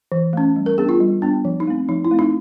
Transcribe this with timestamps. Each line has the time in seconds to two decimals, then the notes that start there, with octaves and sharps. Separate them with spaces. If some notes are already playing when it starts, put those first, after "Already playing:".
0.12 E3
0.33 A3 C#4
0.56 G3
0.66 A#4
0.78 B3 D4 G#4
0.89 F4
1.00 G3
1.22 B3 D4
1.45 F3
1.60 D#4
1.67 A3 C4
1.89 F3 D#4
2.04 E4
2.11 A3 C4
2.19 D#4